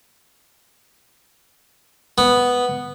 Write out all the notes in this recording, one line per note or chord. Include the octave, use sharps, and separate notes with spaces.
B3